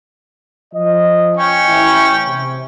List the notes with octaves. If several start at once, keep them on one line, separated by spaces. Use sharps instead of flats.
F3 D#5
C#4 C#5 G5
A1 E3 E4
C3